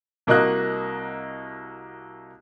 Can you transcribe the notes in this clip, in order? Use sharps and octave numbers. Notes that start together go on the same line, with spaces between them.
C2 A#3 F#4 D#5 D#6 F#6